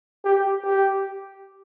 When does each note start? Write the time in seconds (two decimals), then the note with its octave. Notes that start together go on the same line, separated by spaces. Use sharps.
0.25 G4
0.64 G4